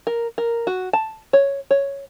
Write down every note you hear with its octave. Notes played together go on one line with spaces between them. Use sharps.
A#4
A#4
F#4
A5
C#5
C#5